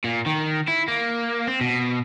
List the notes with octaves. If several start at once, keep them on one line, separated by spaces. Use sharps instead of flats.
A#2
D#3
E4
A#3
C4
B2